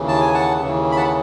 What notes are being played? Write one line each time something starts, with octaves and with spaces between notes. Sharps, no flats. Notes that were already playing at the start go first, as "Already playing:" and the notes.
Already playing: D#2 C#3 E3
A5
G#5
F#5 A5
D#2 C#3 E3
B5
F#5 A5